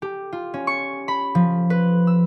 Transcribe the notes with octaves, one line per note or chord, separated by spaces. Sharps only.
G4
F4
C#4
C#6
B5
F3
B4
E6